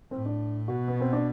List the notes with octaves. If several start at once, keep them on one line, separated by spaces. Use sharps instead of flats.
A2 C4
D4
B2 F#4
B3
C4
D4